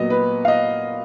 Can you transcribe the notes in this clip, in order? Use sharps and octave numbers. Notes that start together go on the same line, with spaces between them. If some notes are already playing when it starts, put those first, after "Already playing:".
Already playing: A#2 F#3 B3 D#5
B4
F5
D#5